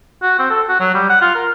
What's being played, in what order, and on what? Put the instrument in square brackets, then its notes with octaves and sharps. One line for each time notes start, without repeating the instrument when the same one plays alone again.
[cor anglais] F#4
C4
A4
F#4
F#3
G3
F#5
F4
A#4